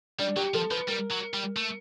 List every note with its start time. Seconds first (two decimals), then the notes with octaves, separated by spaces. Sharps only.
0.19 G3 D4
0.36 F#3 G4
0.54 F3 A4
0.71 F3 B4
0.88 G3 A#4
1.11 F#3
1.34 G3
1.57 A3